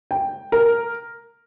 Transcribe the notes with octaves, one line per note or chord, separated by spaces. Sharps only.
G5
A#4